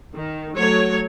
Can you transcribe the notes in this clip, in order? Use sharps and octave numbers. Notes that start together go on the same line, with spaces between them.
D#3
F#3 A3 C#5